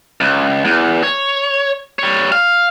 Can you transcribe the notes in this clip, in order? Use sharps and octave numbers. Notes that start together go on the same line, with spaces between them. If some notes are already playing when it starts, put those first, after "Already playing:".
C#2
E2
C#5
G3 C#5
F5